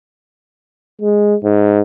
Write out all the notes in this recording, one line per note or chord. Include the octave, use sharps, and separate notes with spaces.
G#3
G#2